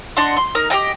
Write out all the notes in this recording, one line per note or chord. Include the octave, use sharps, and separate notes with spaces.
D4 D#5 F#5 C6
C6
D#4 A#4
G4 A4 D#5 G5